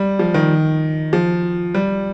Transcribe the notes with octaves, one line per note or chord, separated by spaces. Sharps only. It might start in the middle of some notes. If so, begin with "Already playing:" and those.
Already playing: G3
F3
D#3
F3
G3